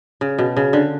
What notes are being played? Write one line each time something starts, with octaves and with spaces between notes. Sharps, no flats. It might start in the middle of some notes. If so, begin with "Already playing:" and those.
C#3
B2
C#3
D3